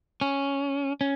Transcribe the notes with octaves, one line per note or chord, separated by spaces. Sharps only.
C#4
C#4